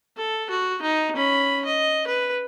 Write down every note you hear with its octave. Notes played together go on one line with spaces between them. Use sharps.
A4
F#4
D#4
C#4 B5
D#5
B4